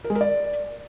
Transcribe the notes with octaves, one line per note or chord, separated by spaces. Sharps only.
A#4
G#3
A#4
D5